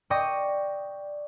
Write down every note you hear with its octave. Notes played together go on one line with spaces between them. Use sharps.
D5 G5 C#6 D#6 A#6